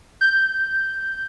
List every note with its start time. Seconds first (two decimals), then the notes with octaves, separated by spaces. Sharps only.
0.21 G6